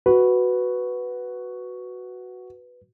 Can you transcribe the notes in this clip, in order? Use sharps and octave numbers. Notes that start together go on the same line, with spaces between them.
F#4 B4